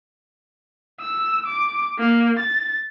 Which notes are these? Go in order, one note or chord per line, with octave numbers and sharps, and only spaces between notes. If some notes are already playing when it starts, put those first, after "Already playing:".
E6
D6
A#3
A6